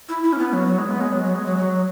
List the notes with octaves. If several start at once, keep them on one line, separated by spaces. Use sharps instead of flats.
E4
E4
C#4
B3
F#3
F#3
G#3
B3
G#3
F#3
F#3
G#3
F#3
F#3